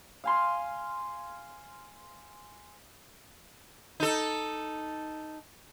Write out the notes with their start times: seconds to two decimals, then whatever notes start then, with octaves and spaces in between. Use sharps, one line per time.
0.24 F5 G#5 C6
4.00 D#4 A4